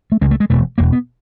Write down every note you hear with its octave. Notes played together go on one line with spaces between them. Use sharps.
A3
C#2 C#3 G#3
A3
G#3
E1 E2 B2 A3
E1 E2 B2 A#3
B3